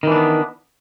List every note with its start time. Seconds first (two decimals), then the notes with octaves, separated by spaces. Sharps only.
0.03 D#3
0.07 E3
0.11 D4
0.16 B3